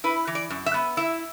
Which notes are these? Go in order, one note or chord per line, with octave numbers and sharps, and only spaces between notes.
E4 B4
E3
D5
F#2
E5
B3
E4 E5